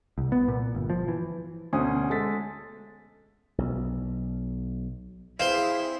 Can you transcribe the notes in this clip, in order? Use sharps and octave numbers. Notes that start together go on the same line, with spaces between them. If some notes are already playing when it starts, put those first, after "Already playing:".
C2
B3
A#2
G1
F3
E3
D2 B2 C#4 C5 G#5 D#6
G#3 A4 A6 B6
B1
C4 E4 G#4 C5 F5 C6